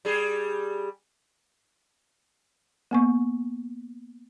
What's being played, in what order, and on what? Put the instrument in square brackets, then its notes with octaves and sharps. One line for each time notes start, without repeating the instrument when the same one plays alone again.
[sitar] G3 G#4
[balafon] A#3 B3 C#6